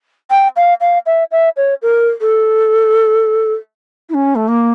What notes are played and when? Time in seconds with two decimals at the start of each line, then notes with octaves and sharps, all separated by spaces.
0.30 G5
0.56 F5
0.81 F5
1.06 E5
1.31 E5
1.57 C#5
1.82 A#4
2.21 A4
4.09 E4
4.14 C#4
4.35 A3
4.48 A#3